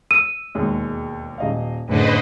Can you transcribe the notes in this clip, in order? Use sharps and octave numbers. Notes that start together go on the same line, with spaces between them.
E6 D#7
E1 D#2 G#3
D#1 D#5 F5
F#1 A2 D3 B4 C5 D#5